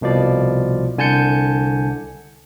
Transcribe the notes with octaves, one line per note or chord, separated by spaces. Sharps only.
C2 B2 F3 D5
C2 D3 G#5 A5 G6 C#7